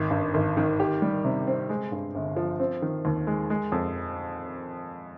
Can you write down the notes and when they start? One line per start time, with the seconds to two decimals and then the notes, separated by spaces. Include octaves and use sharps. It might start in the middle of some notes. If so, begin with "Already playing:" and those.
Already playing: G#1
0.11 G2
0.34 G#1
0.57 D#3
0.80 G4
1.02 G3
1.25 C3
1.47 C4
1.70 G#3
1.92 G2
2.15 G1
2.36 F3
2.60 C4
2.82 D#3
3.05 D#2
3.27 G#3
3.50 G#3
3.72 F2